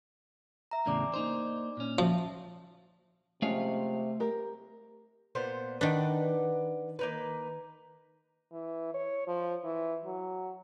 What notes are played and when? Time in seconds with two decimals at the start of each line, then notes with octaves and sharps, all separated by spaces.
0.71 E5 A#5
0.86 E2 A2 C#3 D4 D5 D6
1.14 A#3 D#4 C5
1.77 A#2 C#4
1.98 F3 E5 A5
3.42 C3 F3 G#3 A3 C#4 F5
4.20 G4 A#4
5.35 A#2 B3 C5
5.81 D#3 D4 B4 D5 F#5
6.99 A#3 D#4 B4
8.52 E3
8.94 C#5
9.28 F3
9.64 E3
10.05 F#3